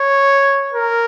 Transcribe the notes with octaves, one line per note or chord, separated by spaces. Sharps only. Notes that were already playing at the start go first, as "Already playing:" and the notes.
Already playing: C#5
A#4